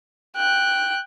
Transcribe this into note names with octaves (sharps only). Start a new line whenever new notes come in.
G5 F#6